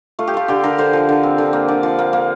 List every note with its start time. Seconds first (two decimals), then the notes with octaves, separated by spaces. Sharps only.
0.19 A3 F4
0.27 G4
0.34 A3 F4
0.48 D3 G4
0.63 D3 A#4
0.78 D3 C5
0.93 F3
1.09 D3
1.23 C4
1.38 D3
1.53 A#3
1.68 D3 D5
1.83 F3
1.99 A#3
2.13 A#3